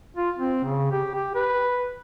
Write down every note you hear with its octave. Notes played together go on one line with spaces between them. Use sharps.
F4
C4
C#3
G4
G4
B4